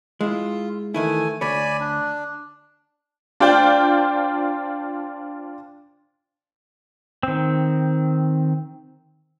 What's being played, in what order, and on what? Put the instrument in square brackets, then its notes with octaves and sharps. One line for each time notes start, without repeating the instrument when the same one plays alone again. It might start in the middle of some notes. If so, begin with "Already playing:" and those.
[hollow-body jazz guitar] G#3 E4 [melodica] F4
[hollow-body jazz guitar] D#3 E3 E4 [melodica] A3 G#5
[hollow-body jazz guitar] D2 C#5 [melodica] D5 G#5 B5
[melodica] D4
[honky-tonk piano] D4 F4 C5 D5 G5
[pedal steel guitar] D#3 C4